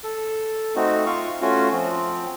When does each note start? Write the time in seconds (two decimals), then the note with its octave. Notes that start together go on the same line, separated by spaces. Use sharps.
0.04 A4
0.76 A3 C4 D#4 F#4
1.06 F4 F5 C#6
1.41 A3 C#4 F4 F#4
1.72 F3 C4